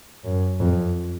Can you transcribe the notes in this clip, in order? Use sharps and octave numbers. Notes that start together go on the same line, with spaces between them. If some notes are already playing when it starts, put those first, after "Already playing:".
F#2
F2